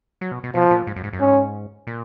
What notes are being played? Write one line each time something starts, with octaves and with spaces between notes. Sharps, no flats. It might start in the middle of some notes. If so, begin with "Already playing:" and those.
F#3
B2
B2
B2 F3
A#2
G#2
F#2
G#2
F#2
G#2 C#4
A#2